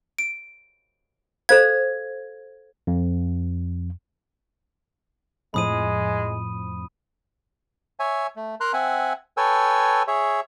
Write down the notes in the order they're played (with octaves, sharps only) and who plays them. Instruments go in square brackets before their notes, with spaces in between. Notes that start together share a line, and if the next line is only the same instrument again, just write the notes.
[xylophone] D7
[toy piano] A4 C5 F5 [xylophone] G#6
[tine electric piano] F2
[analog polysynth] F2 A2 F3 [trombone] G#3 [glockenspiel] B5 D#6 D#7
[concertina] C#5 E5 G#5
A3
A#4 A#5 C6 F#6
C4 E5 F#5 G#5
A4 B4 C#5 G5 G#5 E6
G#4 C#5 E5